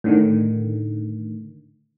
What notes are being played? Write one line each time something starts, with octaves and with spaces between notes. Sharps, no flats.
A2 D3 D#3